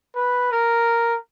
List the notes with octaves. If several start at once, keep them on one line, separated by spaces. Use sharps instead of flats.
B4
A#4